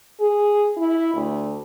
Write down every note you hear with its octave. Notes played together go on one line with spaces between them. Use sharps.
G#4
E4
D2